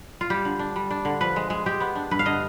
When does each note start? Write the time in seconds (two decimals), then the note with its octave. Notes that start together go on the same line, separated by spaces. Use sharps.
0.21 F4
0.30 G3 G4
0.45 D3
0.59 D4
0.76 G3
0.91 D4
1.05 D3
1.21 F3 B4
1.36 G#3
1.50 G#3
1.66 G#3 G4
1.80 B3
1.95 D4
2.11 G2 B4
2.19 F5
2.26 D3 D#5